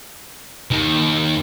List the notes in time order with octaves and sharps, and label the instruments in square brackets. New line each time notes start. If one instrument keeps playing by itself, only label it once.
[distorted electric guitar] D#2 D#3